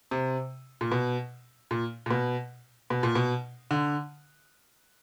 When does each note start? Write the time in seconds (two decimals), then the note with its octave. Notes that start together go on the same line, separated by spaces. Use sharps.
0.11 C3
0.81 A#2
0.92 B2
1.71 A#2
2.06 A#2
2.10 B2
2.90 B2
3.03 A#2
3.15 B2
3.71 D3